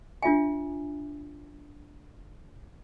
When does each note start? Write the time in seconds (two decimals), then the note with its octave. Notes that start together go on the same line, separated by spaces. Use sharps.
0.23 D4 F4 E5 G#5